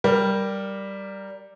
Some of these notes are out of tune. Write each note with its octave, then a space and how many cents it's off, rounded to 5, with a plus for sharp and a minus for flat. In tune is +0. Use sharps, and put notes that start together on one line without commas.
G3 +0 A#4 +0